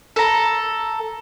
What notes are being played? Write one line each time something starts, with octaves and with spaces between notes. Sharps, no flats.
A4 A#5